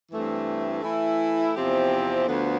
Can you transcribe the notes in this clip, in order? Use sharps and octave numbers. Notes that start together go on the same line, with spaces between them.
G2 E3 A3 C4
E3 A3 E4
E2 C3 F3 C4 G4
D2 D3 F3 B3